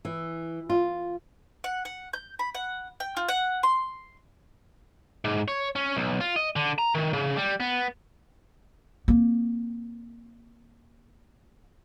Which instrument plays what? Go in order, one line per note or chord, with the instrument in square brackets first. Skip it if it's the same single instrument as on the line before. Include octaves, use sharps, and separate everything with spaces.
[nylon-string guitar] E3
F4
[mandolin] F#5
F#5
G6
B5
F#5
G5
F4
F#5
C6
[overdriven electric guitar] G#2
C#5
C#4
B1
F4
D#5
D3
A#5
D#3
C#3
G3
B3
[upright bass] A#3 C4